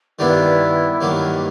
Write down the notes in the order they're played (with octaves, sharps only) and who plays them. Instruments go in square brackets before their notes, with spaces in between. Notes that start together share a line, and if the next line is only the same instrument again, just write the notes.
[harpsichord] G2 D#3 G3 B3 D4 [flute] E4
[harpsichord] G2 D#3 F#3 A#3